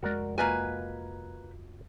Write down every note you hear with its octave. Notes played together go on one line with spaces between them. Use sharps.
F1 G#3 F#4 A#4 D5
A#3 F4 F#4 B4 D#5 G#5